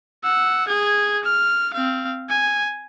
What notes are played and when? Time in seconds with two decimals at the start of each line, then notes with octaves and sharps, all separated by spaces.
0.24 F#5 E6
0.68 G#4 G#6
1.23 F6
1.74 C4 F5
2.29 G#5